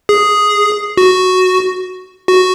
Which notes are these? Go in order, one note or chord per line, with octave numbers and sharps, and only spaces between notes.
G#4
F#4
F#4